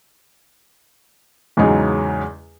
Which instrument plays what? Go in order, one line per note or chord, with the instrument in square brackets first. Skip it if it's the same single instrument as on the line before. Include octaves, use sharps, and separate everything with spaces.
[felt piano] E2 G#2 C#3 F#3 G#3 D#4